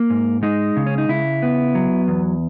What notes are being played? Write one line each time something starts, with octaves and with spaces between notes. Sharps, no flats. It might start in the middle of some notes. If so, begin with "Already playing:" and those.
Already playing: A#3
G#2
G#3 D#4
C#3
C#4
D#4
C#3 E4
B3
F#3
E2